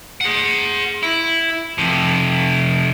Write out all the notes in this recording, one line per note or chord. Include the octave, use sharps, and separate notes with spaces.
G#4 F#5
E4
F2 C3